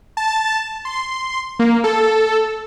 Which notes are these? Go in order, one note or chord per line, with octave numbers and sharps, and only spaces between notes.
A5
C6
A#3
A4